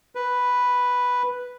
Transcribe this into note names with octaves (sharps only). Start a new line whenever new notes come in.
B4